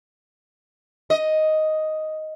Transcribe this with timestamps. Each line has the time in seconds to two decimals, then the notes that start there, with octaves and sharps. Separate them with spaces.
1.10 D#5